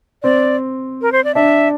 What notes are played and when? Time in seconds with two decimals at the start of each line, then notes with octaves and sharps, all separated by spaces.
0.23 C4 D5
1.02 A#4
1.12 C5
1.24 D5
1.35 D4 E5